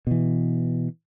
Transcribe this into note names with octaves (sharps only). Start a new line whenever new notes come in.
B2 E3